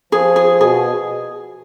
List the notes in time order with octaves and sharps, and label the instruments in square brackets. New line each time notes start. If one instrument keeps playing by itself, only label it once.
[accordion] F3 [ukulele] G#4
[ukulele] G#4
[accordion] B2 [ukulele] G#4